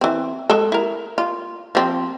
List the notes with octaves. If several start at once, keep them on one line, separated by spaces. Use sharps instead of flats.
E3 C4
G#3 A4
E4 A#4
F4
F3 C4